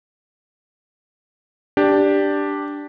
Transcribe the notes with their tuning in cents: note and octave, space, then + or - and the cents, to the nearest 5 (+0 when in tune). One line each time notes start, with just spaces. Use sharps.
D4 +0 G4 +0